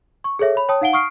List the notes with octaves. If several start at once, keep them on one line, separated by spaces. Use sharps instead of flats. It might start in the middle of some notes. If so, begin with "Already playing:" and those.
C#6
G#4 A4 C#5 E5
C#5 B5
C#5 G5 A5 D#6
D#4 F5 F#5 D7 G7
C#6 D#6 F6 C7 D7